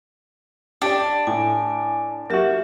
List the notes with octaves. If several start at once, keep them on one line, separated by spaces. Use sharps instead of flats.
D4 G4 D5
A2 G#5
F#3 A#3 F#4 G4 E5